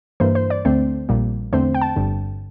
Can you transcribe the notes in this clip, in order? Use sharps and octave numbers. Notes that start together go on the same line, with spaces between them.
G2 E3 A#3 C5
C5
D5
D2 D3 A3 C4 C5
A#1 A#2 G3
E2 D3 A3 C4 C5
G5
A5
G1 G2 D3